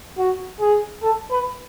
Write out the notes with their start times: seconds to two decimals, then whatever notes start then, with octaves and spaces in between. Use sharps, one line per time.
0.18 F#4
0.60 G#4
1.02 A4
1.31 B4